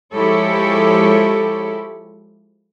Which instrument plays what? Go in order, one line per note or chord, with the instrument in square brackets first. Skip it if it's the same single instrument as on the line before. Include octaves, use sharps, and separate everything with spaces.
[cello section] F3 G#3 E4 G4 A4 C#5